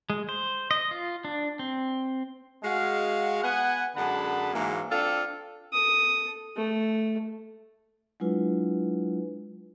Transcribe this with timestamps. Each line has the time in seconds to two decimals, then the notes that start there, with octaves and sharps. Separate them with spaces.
0.10 G#3
0.29 C5
0.71 D#5
0.91 F4
1.25 D4
1.59 C4
2.63 G#3 F#4 F5
3.42 B3 F#5 G#5
3.95 F#2 D3 G#3 F#5 A5 B5
4.53 G#2 E3 F#3 A#3
4.90 C4 D4 F4 A4
5.73 A4 D#6
6.56 A3
8.20 F#3 G#3 D4 E4 F4 B4